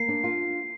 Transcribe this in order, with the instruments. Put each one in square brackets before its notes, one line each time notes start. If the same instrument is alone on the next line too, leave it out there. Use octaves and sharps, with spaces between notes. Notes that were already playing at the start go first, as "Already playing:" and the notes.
Already playing: [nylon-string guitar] A#3 [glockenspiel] C7
[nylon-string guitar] D4
F4